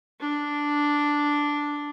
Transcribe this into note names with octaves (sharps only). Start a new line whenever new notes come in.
D4